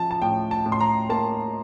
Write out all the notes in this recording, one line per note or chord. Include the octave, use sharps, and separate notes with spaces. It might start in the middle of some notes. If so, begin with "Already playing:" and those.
Already playing: F3 A5
A5
A2 G5
A5
A2
C6
A#5
A#3 A5